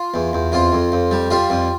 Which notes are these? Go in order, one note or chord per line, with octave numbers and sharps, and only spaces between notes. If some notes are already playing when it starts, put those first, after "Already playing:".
Already playing: F4
E2
E2
F2 F4
F2
F2
G3
G3 F4
F2